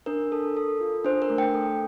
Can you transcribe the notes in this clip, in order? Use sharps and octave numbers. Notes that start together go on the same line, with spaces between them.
D4 A#4
A4
A4
F4
D4 C5
A#4
A3
G5
A4